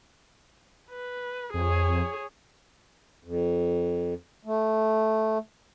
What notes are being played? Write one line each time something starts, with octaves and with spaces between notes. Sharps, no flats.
B4
F2 G#4 C#5
F2
A3